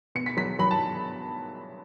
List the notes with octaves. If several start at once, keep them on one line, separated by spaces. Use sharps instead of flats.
B2 C#7
B6
F#3 B6
F#3 B5
A5